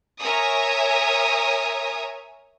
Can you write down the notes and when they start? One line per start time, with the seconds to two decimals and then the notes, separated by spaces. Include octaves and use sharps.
0.22 A#4 C#5 E5 G#5 A#5 D#6